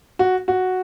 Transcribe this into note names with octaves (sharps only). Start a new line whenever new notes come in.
F#4
F#4